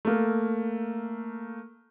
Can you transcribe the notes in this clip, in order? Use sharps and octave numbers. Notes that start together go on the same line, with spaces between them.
A3 A#3